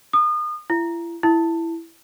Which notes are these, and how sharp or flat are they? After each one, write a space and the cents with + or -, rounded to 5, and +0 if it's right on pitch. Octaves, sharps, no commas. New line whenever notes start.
D#6 -35
E4 +40
E4 +10